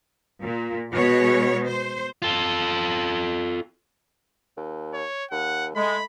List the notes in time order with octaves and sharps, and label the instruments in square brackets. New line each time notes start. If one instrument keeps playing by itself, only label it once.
[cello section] A#2
B2 G#3 C#5
C5
[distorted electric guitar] F4 A4
[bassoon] D#2
[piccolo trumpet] C#5
[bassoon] D#2 [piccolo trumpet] F#5
[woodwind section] G#3 [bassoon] A3 [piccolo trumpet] B5